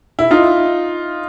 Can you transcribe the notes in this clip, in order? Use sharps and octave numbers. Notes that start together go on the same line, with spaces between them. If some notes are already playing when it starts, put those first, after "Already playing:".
E4
D#4 F4